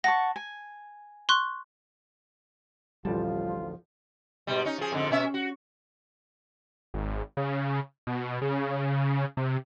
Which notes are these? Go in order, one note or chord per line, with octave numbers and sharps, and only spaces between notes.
F#5 A5 C#6 A#6
G#5
C6 C#6 F#6
A1 D2 F3 G3 F4 A5
G#2 B2 G3
C#4 D#4
F3 G#4
F2 G#2 D3
B2 C#4 E5
F#4
G#1
C#3
B2
C#3
C3